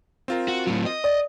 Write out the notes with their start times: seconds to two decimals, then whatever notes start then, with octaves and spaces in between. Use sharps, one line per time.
0.28 C4 F4 A#4
0.48 F#4
0.67 A2 F#3
0.86 D#5
1.04 D5 D#6